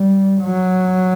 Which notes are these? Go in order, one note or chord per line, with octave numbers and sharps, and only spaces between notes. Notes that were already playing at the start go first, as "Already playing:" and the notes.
Already playing: G3
F#3